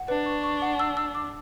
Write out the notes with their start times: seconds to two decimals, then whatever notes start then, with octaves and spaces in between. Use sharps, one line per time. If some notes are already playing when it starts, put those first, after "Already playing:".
Already playing: F#5
0.08 D4 B4
0.26 C#6
0.44 C#6
0.62 F#5
0.79 E6
0.97 E6
1.15 D6